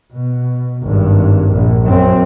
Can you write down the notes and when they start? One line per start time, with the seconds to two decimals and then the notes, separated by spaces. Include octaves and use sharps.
0.13 B2
0.83 G#1 G2
1.52 A#1
1.84 F#2 C4